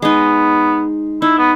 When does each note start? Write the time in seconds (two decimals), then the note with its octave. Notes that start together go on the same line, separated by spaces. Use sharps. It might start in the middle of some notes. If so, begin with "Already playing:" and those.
0.02 G#3 B3 D#4
1.22 D#4 E4
1.38 B3